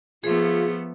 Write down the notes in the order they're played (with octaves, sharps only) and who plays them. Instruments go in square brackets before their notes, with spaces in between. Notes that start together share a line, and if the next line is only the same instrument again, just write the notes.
[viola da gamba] F3 A3 B3 [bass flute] F4 [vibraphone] G#4